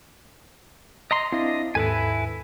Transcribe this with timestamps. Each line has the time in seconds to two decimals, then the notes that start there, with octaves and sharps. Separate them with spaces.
1.11 D#5 A#5 C6
1.33 C4 D4 E4 D#5 F5
1.75 D#2 G#2 E4 A4 B4 G#5